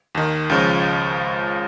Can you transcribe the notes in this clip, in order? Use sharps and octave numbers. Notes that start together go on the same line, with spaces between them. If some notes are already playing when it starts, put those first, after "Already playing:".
D#2 D#3
C#2 C#3 F3